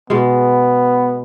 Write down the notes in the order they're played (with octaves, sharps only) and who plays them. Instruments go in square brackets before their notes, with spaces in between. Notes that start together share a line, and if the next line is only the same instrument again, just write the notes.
[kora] B2 G#3 [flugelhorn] B3